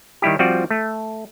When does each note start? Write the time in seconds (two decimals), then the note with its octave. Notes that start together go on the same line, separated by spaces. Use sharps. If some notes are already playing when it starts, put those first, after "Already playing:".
0.22 D#3 G3 E4 G4
0.39 F3 G3 C4 F4 F#4 D5
0.71 A3